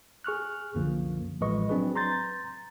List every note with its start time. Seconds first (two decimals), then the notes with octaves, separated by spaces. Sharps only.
0.24 G#4 C#6 F6 F#6
0.74 C2 F#2 D3 F3 A#3
1.41 A1 F3 G#3 B4 D#5 C#6
1.69 F#3 C4 D4 G#4 B4
1.95 A#5 C6 G6 A6